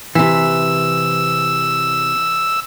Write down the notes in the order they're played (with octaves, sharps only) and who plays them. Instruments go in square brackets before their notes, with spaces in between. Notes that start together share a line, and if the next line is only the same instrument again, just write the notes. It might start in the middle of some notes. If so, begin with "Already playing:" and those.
[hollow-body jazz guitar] C3 E3 [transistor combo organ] E6